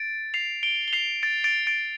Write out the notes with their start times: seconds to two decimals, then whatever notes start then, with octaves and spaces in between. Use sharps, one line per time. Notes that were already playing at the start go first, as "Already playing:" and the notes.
Already playing: A6 D7
0.34 C7 F7
0.63 D7 G7
0.88 G7
0.93 C7 F7
1.23 A6 D7
1.44 A6 D7
1.67 A6 D7